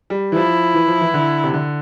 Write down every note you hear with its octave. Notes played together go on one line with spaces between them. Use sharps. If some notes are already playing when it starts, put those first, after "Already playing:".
G3
E3
F3 E4
E3
F3
E3
D3
C3
D3